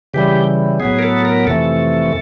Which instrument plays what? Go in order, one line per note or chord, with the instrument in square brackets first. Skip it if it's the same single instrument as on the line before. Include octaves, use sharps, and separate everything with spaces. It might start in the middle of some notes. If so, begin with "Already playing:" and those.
[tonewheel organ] C#3 E3 G3 G4
A2 F#3 B3 G#4
A#4
A4
A#4
F2 C3 E3 A3 A4